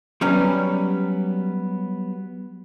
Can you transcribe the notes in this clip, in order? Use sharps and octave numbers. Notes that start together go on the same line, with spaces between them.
F#3 G3 B3 C#4